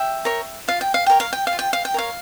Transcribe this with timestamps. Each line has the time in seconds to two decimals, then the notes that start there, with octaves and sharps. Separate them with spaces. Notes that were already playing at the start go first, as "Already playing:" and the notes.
Already playing: E5 G5
0.25 A#4 C#5
0.68 F4 F5
0.81 G5
0.94 F5
1.06 A#4 C#5 G5
1.20 F5
1.33 G5
1.47 F5
1.53 F4
1.59 G5
1.73 F5
1.85 G5
1.94 A#4 C#5 F5